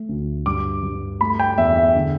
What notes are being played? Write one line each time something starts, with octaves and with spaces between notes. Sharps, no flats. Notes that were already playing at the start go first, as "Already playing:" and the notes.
Already playing: A3
D2
G2 D6
G2
A3 B5
G5
E2 E5
E5
D3